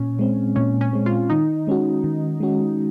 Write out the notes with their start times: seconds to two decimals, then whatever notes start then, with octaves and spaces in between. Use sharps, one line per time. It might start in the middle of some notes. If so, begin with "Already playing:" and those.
Already playing: A#2 C#4
0.19 G#3 C4
0.56 A#2 C#4
0.81 C#4
0.93 G#3 C4
1.06 F4
1.30 D#3 D#4
1.67 G#3 C#4 F#4
2.04 D#3
2.40 G#3 C#4 F#4